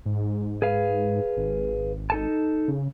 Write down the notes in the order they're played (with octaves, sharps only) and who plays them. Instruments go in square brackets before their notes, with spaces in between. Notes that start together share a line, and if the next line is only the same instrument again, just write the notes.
[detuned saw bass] G#2
[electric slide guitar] G#4 B4 F5
[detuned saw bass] G#1
[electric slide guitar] D#4 A4 A5
[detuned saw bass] C#3